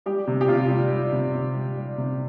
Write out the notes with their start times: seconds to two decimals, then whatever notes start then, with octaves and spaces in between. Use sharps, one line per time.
0.06 G3 G4
0.27 C3
0.41 G4
0.48 C3 F4
0.70 G3
0.91 G3
1.12 C3
1.35 C3
1.55 G3
1.77 G3
1.98 C3